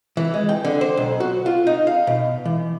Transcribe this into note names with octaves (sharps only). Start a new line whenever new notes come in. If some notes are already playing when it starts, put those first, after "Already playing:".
E3
G#3
G5
D3
C5
B1
F#4
F4
D#4
F5
B2
E3